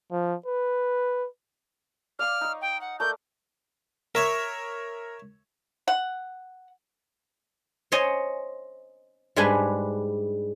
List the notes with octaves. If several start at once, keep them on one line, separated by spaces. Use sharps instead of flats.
F3
B4
D5 F5 D6 F6
D#4 C#6
G5
F#5
A3 A#4 D5 G6
A#4 C#5 E5
F#5
C5 C#5 D#5 G#5
G#2 G3 G#3 D4 B4 G#5